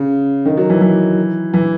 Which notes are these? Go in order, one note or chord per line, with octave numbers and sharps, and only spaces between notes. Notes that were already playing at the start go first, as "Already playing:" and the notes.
Already playing: C#3
D#3
F#3
E3
E3
E3